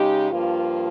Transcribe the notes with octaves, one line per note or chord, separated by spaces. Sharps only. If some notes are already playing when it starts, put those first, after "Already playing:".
Already playing: C#3 G#3 D#4 G4
G2 F3 A#3 F4